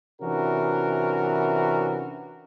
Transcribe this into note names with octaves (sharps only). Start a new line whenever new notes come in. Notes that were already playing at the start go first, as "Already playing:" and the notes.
C3 E3 C#4 D4 F#4 A#4